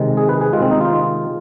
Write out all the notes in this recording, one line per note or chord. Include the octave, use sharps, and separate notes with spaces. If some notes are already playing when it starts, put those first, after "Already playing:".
Already playing: C3 D#3 G#3
G#4
B4
G#4
C3 D#3 G#3 F4
C4
D#4
F4